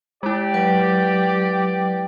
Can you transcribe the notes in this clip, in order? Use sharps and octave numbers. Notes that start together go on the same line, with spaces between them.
G#3 E4 G4 D5
F#3 B4